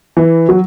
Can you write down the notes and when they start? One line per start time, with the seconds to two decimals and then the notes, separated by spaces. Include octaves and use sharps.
0.17 E3
0.49 F#3